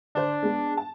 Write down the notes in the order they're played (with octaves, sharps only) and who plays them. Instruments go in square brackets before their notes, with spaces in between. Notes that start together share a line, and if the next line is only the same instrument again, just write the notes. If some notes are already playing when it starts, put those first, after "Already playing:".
[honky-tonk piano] D3 C5 [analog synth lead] D4
[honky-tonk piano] G#3 B3
A5